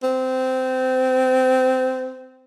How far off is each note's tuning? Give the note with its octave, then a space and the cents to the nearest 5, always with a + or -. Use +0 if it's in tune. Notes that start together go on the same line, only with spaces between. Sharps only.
C4 -20